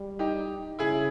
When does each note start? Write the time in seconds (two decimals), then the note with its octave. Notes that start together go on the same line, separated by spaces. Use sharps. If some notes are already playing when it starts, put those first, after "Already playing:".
Already playing: G3
0.19 D#4 G4
0.79 C#3 E4 G#4